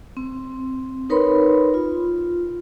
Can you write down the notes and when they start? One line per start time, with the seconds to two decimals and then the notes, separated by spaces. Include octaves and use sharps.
0.17 C4
1.10 D#4 A#4 B4 C#5 B5 C6
1.74 F4